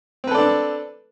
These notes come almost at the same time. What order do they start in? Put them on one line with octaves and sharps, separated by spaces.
C4 B4 A4 D5 D4